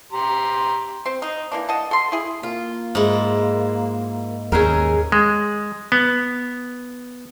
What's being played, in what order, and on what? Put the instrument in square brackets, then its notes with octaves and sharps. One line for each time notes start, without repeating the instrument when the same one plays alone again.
[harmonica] G4 A#5 C6
[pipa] C4
D#4
E3 A#3 D4
D#5 F#5 A5
A4 C6
E4 G#4
[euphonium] A#3 [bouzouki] F4
[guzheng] G#2 E4
[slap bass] D#2 [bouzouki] C#4 G#4 A#4
[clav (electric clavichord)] G#3
B3